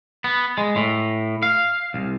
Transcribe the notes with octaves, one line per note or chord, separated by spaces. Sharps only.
B3
G#3
A2
F5
C2